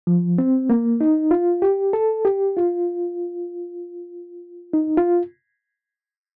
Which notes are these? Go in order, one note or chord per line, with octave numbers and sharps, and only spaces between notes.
F3
C4
A#3
D#4
F4
G4
A4
G4
F4
D#4
F4